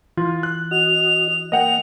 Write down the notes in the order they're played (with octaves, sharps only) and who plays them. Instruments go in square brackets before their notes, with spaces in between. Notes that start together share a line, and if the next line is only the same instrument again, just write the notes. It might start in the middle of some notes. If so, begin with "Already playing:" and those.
[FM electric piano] E3 [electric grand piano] F4
[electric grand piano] F#6
[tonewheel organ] F#4 D#5 [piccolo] F7
[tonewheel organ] A#3 [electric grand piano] D#5 F#5 G5 [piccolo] F7